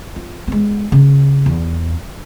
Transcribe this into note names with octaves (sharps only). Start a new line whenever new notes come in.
F4
G#3 B3
C#3
E2